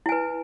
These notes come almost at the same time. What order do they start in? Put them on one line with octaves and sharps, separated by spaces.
E4 G#5 B4